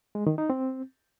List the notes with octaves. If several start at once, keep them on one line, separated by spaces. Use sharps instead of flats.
G#3
D#3
D#4
C4